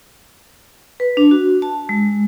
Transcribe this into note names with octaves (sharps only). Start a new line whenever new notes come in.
B4
D4
F#4
A5
G#3